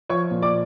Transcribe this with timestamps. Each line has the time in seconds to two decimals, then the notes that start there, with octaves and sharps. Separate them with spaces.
0.09 F3 C#5 C#6
0.31 A#2
0.42 D5 D6